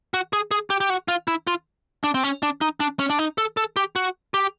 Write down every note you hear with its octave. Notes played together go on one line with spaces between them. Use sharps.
F#4
G#4
G#4
G4
G4
F#4
F4
E4
F4
D4
C4
C#4
D4
D#4
D4
C#4
D4
D#4
A4
A4
G4
F#4
G4